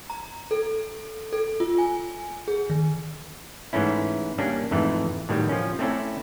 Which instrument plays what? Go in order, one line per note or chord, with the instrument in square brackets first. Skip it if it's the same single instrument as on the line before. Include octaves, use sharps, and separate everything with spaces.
[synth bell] A#5
A4
A4
F4
G#5
G#4
D#3
[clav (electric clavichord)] G#2 E3 A3 C#4 E4
G3 A#3 C#4 D4
F2 G#2 E3 A3
A2 D#3 F#3 G3
F3 C#4
A3 C4 C#4 E4 A4 D5